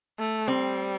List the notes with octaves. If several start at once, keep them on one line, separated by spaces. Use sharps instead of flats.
A3
G3 C4